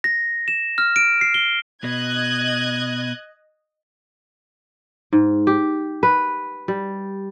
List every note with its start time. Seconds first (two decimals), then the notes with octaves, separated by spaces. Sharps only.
0.04 A#6
0.48 E7
0.78 F6
0.96 D7
1.21 C7
1.34 G7
1.84 B2 D#5 F#6 G#6
5.13 G#2
5.47 G4
6.03 B4
6.68 G3